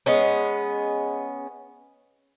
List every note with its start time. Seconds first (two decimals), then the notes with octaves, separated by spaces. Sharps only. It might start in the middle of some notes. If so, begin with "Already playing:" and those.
0.06 G#3 B3 C#4